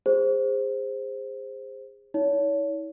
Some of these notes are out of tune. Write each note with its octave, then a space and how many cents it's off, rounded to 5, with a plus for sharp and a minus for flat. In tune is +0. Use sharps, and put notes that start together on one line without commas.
G#4 -35 C5 +0
E4 -45 C#5 +30